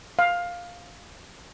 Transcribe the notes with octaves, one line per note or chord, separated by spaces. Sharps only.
F5